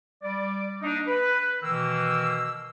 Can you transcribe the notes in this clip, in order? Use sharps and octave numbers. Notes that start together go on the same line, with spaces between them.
G3 D5
A#3 D4 D#4
B4
B2 D#3 E3 A#3 E6